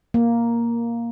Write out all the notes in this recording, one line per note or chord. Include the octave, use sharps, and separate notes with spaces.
A#3